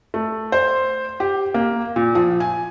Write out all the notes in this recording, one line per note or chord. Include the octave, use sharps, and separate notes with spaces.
A3
C5
G4
A#3
A#2
F3
G#5